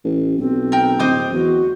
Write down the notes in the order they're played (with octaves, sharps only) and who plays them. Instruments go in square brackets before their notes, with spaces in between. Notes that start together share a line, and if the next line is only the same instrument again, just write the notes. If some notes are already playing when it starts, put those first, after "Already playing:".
[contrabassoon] A1
[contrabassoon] B1 [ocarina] C4
[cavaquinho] A#4 G5
[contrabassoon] D1 [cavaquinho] C5 D#5 D6
[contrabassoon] E2 [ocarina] F#4